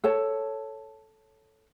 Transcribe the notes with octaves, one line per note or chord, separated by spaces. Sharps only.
A4 C#5 A5